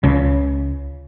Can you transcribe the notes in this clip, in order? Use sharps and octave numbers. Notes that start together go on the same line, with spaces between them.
C#2 C#3